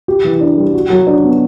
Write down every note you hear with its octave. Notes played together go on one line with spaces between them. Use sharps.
G4
E3
D4
G3
F#4
F#3
D4
B3